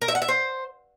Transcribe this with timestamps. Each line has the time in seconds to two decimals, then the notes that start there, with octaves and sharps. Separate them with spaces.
0.02 A#4
0.08 E5
0.15 F#5
0.22 E5
0.28 C5